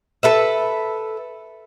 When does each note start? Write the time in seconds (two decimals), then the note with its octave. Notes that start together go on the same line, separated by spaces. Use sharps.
0.23 A4 B4 E5